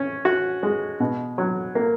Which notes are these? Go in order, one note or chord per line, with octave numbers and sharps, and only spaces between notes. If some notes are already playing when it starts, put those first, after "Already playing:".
Already playing: C#4
F#4
G#3
B2
F#3
A#3